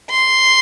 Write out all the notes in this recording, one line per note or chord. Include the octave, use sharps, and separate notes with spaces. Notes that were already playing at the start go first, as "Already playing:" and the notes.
C6